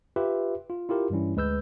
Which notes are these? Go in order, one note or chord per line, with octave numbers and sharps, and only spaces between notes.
F4 G4 B4 E5
F4
E4 F4 G4 A#4
G2 E3 G3 C#4 E4
D2 G#3 B4 E6 G6